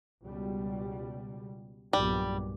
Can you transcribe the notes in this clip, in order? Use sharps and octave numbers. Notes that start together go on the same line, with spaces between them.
C#2 B2 G3
B1 G2 A#2 G3